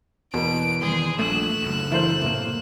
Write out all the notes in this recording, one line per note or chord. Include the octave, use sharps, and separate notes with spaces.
E2 B2 A#3 D7
D#3 F#3 G3 G#4 C6
A#1 A3 F#6 E7
F#1 D2
E3 A3 A#4 C5
C2 A2 A#3